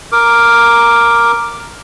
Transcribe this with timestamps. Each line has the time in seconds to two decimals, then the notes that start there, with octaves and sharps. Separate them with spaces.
0.12 A#4 D6